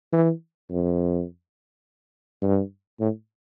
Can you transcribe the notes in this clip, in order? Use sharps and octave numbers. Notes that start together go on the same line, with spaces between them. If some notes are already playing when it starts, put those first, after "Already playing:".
E3
F2
G2
A2